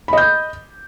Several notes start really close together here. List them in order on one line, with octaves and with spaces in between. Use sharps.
B5 D#5 G6